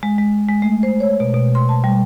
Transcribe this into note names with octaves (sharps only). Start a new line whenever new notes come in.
G#3
G#3
G#3
A3
C5
C#5
B2
B2
C6
A5
G3